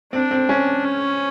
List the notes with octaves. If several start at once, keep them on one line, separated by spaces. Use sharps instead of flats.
C4 D4
C4
C#4
C#4